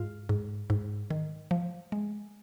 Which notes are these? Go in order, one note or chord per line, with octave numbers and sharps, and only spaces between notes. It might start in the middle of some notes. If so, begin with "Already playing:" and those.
Already playing: G#2 F4
G#2
G#2
D#3
F3
G#3